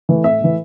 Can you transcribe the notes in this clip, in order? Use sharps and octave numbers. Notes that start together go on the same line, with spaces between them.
E3 A3
A2 E5
E3 A3